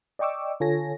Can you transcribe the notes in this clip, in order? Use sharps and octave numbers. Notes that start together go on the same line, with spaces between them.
D5 D#5 G5 C#6 D6 E6
D3 F4 A4 C#5 G#5 A#6